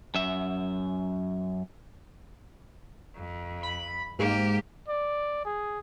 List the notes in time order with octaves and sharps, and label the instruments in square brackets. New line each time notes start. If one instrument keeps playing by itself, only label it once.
[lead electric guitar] F#2 E5
[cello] F2
[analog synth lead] B5
[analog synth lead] G#2 [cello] A#3 G4
[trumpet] D5
G#4